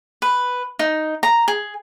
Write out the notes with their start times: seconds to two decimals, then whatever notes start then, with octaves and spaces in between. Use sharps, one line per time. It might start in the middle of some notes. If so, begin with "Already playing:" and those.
0.22 B4
0.79 D#4
1.23 A#5
1.48 G#4